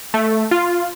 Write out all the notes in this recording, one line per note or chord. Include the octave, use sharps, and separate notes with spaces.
A3
F4